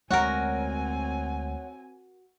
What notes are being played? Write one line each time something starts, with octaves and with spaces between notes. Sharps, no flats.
D2 G#3 C4 F#4 A#4 C#5 F#5 G#5